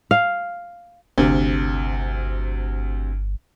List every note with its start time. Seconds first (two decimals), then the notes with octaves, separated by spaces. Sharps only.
0.11 F5
1.18 G1 D2 C3